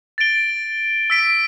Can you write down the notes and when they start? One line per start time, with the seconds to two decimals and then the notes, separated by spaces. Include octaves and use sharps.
0.18 A6 D7 G7
1.10 E6 B6 D7